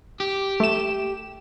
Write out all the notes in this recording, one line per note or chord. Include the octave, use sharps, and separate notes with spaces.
G4
A3 E7